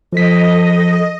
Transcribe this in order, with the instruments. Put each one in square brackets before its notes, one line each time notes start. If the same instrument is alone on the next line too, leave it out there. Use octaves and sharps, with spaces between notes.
[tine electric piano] F3 B6 [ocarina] A4 [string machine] D#5